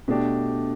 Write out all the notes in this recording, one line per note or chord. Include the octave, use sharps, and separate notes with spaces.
B2 A3 D4 G4